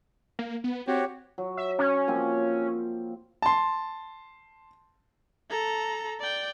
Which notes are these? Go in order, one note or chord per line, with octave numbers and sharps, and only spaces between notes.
A#3
B3
C4 F#4 G4 C#5
F#3
E5
C#4
F3 A#3 C4
A5 C6
A4 A#5
D5 G5